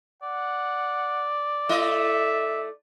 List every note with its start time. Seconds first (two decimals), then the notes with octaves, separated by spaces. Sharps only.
0.23 D5 F#5
1.69 A3 E4 D#5 E5